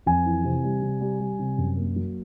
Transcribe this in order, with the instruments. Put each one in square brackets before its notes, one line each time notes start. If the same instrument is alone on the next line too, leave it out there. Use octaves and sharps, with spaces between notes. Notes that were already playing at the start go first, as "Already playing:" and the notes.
[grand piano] F2 G#5
E3
C3
G3
C3
G3
G3
C3
F#2
A#3
F#3